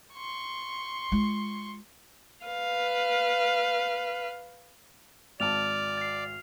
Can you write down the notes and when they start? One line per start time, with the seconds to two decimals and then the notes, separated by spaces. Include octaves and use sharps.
0.13 C6 C#6
1.12 G#3 F4
2.46 B4 F5
5.40 G#1 D5 A5 F6 F7
5.98 A6 C7